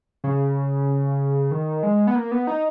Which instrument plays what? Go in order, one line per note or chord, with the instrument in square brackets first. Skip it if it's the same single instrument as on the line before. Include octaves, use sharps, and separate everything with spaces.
[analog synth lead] C#3
D#3
G#3
B3
A#3
B3
D#4